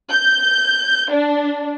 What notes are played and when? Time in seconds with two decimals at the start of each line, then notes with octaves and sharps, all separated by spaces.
0.11 G6
1.12 D4